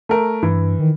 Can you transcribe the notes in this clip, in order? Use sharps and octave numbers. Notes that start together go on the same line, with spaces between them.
A3 A#4
G2 E3
D#3